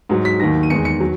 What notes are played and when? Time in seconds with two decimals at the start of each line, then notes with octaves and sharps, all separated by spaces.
0.09 G#2 F#3
0.25 B6
0.40 D#2 D#3 F#3 A#6
0.63 D#7
0.70 E2 D#3 G#3 C#7
0.85 C#7
1.00 F#3